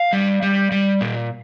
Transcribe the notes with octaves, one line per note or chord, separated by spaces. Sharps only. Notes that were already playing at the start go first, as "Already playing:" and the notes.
Already playing: F5
G3
G3
G3
A#2